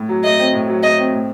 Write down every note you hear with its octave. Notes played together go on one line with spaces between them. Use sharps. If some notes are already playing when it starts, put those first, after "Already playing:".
Already playing: A2
F#3
A3 D#5
C4
A2
F#3
A3 D#5
C4
A2